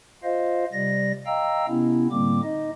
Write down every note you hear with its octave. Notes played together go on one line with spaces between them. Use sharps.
F4 C5 D#5 F5
C3 G3 D5 A#6
D#5 F5 G5 A#5 E6
C3 B3 C#4 E4
A2 D3 G3 A#3 C4 D6
D#4 D#5